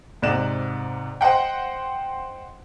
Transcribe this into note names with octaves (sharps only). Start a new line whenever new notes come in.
G#2 C3 D5 D#5 F#6 E7
C5 D#5 F#5 G5